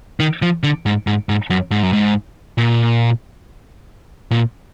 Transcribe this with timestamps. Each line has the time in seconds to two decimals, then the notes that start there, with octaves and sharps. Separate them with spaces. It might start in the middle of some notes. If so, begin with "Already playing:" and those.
0.20 D#3
0.42 F3
0.63 D3
0.86 G#2
1.07 G#2
1.29 G#2
1.50 F#2
1.71 G#2
1.83 F#2
1.93 G#2
2.58 A#2
4.31 A#2